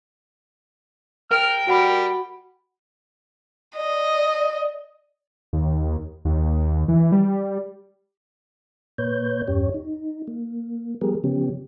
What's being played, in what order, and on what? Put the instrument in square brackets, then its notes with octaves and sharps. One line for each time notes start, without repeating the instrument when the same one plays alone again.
[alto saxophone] A#4 [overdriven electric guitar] G5 [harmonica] F6
[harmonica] G3 [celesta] F#4 F#5 B5
[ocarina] D5 [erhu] D#5
[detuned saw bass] D#2
D#2
E3
G3
[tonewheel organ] A#2 A#3 B4 C#5 G6
E2 G2 C#4 G4 C#5
D#4
A#3
F3 G3 B3 G4 G#4 A#4
C#3 F3 B3 C#4 G4